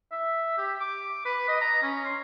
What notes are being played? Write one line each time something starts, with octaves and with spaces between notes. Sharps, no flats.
E5
G4
D6
B4
D#5
A#5
C#4
C6